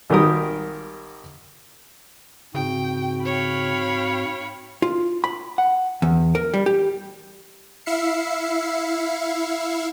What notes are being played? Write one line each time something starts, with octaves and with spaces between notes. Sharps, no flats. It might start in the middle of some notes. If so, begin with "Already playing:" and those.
G#1 D#3 G3 G4 A#4 D#6
G#2 C#3 C4 F#4 G5
C#5 F5 G5 B5
F4
B5
F#5
E2
A#4
G3
G4
E4 E5 F5 C7 C#7